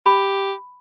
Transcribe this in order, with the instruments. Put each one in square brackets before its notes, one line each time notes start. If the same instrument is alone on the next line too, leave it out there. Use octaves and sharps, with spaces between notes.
[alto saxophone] G4 [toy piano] B5